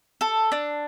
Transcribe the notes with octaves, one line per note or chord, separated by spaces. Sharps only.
A4
D4